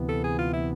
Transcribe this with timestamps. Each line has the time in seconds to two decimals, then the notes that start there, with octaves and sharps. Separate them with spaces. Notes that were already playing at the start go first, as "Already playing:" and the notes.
Already playing: D2 C3 E3 B3
0.08 A4
0.24 G#4
0.39 F4
0.53 E4